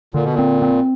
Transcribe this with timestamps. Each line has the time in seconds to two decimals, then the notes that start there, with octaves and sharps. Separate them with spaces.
0.14 A#2 D3
0.24 B2
0.34 A#2 C4
0.62 C4